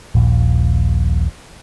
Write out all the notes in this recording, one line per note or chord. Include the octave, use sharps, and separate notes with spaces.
D#1 A#1